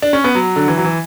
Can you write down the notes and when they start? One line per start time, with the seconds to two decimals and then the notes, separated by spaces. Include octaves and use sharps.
0.02 D4
0.13 C#4
0.24 B3
0.35 F#3
0.56 D3
0.68 E3
0.77 F#3
0.84 E3